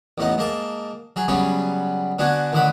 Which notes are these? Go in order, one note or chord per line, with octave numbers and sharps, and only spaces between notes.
A1 A2 B3 D#4
G#2 A#3 A5 D6
F#3 G#4
C#3 F#3 G3 B3 C#4
D3 B3 D4 F#4 G#5
A1 D3 D#3 F#5 B5